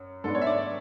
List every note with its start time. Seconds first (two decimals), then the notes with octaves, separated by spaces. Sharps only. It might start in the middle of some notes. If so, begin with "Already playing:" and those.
Already playing: F#2
0.24 G#2 G#3 B3 D4 A4
0.35 C#5
0.42 E5
0.47 D5
0.57 D5